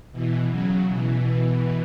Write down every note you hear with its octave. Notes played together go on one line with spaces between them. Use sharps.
B2 E3
C#3 F#3
B2 E3